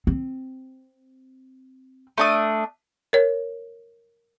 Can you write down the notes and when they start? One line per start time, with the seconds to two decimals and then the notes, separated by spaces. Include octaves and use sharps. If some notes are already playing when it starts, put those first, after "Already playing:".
0.07 C4
2.18 A3 D4 D#6
3.13 A#4 C#5